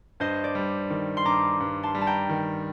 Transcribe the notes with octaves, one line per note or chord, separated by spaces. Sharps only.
G2 C5 D#5
D5
G3
D#3
C6
G2 A#5 D6
G2
A5 C6
G3
A5
G5 A#5
D#3